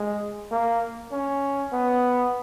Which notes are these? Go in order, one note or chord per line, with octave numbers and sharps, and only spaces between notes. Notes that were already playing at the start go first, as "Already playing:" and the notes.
Already playing: G#3
A#3
C#4
B3